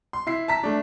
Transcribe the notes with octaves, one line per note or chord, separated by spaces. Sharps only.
C6
E4 C7
A5 A#5 B6
A3 D4